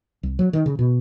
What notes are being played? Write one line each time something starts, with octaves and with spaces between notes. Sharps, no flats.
C2
F#3
D#3
C#3
B2